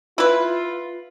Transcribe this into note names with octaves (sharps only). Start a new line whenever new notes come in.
E4 F4 B4